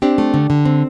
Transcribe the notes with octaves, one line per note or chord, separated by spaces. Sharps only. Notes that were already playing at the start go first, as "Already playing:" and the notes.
C4 D4 G4
A3
D3
D3
C4